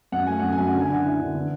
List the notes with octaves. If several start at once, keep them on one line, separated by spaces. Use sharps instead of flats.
F#2 F#5
A3 G#5
F#2 F#5
G#5
F#2
F#5
D3
G#5
D3 F#5
E4
D3
E3